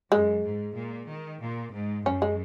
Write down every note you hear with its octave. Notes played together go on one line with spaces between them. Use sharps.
F#2 G#3
G#2
A#2
D#3
A#2
G#2
F#2 C#4
G#3